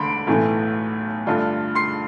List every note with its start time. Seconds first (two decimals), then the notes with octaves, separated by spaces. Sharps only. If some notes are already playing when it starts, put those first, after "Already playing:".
Already playing: E1 D2 D3 A3 B5 C6 D7
0.27 B1 A2 E3 A3
1.27 G2 D3 A3 D4 F4
1.75 C6 C7